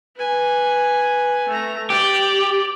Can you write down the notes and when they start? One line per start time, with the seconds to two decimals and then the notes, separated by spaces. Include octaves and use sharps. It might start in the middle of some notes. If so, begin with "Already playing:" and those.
0.16 B4 G#5
1.48 A3 A#5
1.90 G4 D5